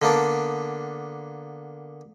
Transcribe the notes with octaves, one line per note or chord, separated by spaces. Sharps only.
D3 A#3 B3 D4